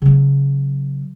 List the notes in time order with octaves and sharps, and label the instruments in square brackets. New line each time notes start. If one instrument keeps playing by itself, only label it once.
[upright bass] C#3 F#3